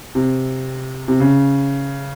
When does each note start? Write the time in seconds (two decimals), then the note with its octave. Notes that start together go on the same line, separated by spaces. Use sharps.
0.15 C3
1.08 C3
1.20 C#3